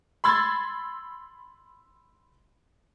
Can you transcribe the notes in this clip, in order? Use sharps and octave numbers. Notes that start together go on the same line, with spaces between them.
B5 C6 E6 G#6 A6